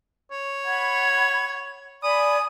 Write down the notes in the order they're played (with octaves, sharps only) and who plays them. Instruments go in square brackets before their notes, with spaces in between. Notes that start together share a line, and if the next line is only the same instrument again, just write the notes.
[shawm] C#5
[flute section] F#5 B5 G#6
[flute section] D5 G#5 B5 [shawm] D#6